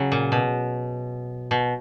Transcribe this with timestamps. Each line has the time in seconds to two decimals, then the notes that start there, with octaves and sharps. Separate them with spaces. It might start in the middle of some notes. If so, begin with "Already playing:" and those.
Already playing: C#3 F#3
0.12 A#2
0.32 B2
1.51 B2